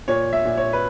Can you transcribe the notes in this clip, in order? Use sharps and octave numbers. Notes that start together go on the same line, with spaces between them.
A#2 C#5
E5
A#2
C#5
B4